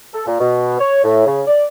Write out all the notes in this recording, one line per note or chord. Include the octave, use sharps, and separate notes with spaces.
A4
A#2
B2
C#5
A2
C#3
D5